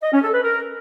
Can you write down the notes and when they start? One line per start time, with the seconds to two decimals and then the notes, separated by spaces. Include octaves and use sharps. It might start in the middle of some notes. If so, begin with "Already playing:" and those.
0.02 D#5
0.12 C#4
0.22 A4
0.32 B4
0.43 A#4